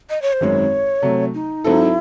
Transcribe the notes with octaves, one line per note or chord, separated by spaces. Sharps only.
D#5
C#5
C5
G#1 F#2 D#3 G#3 C4 C#5
C3 F#3 A3
D#4
G#2 F#3 C4 D#4 E4 A4